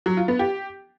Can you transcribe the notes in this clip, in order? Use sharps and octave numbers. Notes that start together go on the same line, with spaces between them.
F#3
F4
B3
G4